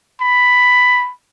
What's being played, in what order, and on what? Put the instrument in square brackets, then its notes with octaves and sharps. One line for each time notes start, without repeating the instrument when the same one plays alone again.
[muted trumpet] B5